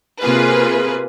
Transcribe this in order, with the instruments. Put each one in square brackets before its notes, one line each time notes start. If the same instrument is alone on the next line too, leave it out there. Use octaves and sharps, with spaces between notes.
[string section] C3 A#3 F4 G#4 B4